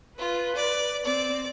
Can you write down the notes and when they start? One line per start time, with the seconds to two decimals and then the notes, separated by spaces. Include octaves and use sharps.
0.19 F4 B4
0.56 D5
1.05 C4 D5